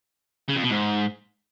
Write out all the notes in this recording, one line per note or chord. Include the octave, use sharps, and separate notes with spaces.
C#3
F2
B2
G#2